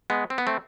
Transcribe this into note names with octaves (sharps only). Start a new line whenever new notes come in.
G#3 B3
C4
B3
A3 C4